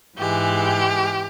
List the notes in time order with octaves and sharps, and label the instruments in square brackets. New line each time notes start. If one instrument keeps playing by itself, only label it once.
[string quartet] G#2 E3 G#3 G4